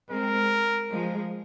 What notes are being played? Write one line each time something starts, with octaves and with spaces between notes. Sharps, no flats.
G#3 C4 A#4
F3 G#3